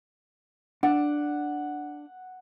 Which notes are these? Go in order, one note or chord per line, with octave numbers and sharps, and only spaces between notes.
D4 F#5